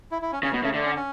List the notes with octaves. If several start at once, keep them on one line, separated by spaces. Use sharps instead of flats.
E4
E4
C#4
C#3 C#4
B2 B3
C#3 A3
D3 A3
C#4
C#4